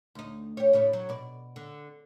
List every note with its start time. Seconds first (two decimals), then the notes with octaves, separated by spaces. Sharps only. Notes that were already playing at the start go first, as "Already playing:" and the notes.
0.15 D2 D#4
0.57 G4 C#5
0.73 A2 C#3 C#5
0.93 F#3
1.09 B2 D5
1.56 D3